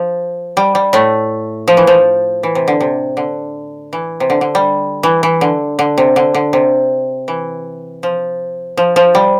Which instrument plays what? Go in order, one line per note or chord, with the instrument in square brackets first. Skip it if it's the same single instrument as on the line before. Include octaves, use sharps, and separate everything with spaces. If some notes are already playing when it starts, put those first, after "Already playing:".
Already playing: [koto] F3
G3
G3
A2 A3
F3
E3
F3
E3
C3
D3
C3
D3
E3
C3
D3
D3
G3
E3
E3
D3
D3
C3
D3
D3
C3
E3
F3
F3
F3
G3